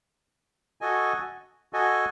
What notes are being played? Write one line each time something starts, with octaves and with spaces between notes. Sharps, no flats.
F#4 A4 D#5 G#5
F#4 A4 D#5 G#5